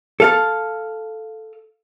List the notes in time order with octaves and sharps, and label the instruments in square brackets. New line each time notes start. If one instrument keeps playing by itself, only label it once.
[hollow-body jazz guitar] A4 F5 A5